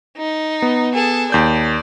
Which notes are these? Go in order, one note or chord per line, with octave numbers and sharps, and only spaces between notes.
D#4
B3
G#4 A4
D#2 D5 G6